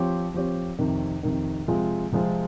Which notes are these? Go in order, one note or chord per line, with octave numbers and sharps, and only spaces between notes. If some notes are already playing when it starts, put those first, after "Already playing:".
Already playing: F3 C4 G4 C#5
F3 C4 G4 C#5
F2 C3 D#3
F2 C3 D#3
C3 F3 G#3 C4 F4
C3 F3 G#3 C4 F4